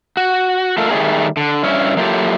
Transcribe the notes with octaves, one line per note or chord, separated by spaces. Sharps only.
F#4
A3 F4 A4 A#4
D#3 G3 A3 B3 D#4 G#4
D3
G2 C#4 E4
F#3 A#3 E4 F4 G4 A4